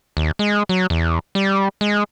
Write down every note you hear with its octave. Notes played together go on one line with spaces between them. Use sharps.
D#2
G#3
F#3
E2
G3
G#3